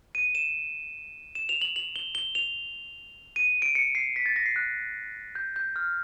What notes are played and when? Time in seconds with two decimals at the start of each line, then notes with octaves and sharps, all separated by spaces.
0.15 D#7
0.35 E7
1.35 E7
1.49 F7
1.61 F#7
1.76 F#7
1.96 G7
2.15 G7
2.35 F7
3.36 D#7
3.62 D7
3.75 C#7
3.95 C7
4.16 B6
4.26 A6
4.36 A#6
4.46 C7
4.56 F#6
5.35 G6
5.56 G6
5.76 F6